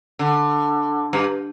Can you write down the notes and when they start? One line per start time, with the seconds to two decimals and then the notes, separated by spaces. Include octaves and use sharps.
0.19 D3
1.13 G2